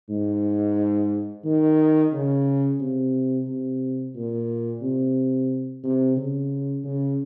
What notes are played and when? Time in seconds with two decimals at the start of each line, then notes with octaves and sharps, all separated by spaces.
0.09 G#2
1.44 D#3
2.13 C#3
2.80 C3
3.47 C3
4.15 A#2
4.81 C3
5.84 C3
6.17 C#3
6.84 C#3